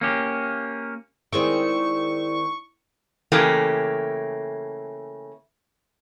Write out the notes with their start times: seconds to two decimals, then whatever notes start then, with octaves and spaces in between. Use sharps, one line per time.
0.01 A#3 C#4 G4
1.32 D#3 G#3 C4 E4 D5 C#6
3.32 C#3 E3 A3 A#3 G4